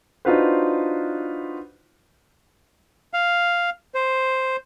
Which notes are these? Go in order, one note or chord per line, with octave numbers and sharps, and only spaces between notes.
D4 D#4 F4 F#4 B4 C5
F5
C5